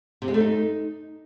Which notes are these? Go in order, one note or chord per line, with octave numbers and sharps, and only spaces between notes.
C3
G#3
A3
D#4